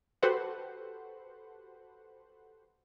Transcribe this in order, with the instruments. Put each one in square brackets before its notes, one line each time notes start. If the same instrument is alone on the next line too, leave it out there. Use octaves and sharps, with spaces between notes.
[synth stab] F#4 G4 A4 B4 C5 F#5